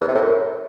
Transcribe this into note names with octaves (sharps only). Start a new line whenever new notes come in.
E2
C3
A2
F#2